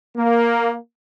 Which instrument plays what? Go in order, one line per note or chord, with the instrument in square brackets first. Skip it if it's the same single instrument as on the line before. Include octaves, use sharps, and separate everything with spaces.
[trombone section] A#3